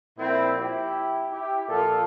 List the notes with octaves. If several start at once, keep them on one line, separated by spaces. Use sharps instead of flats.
A#2 F3 C4 E4
E4 G4
E4 G4
A#2 F3 F4 A4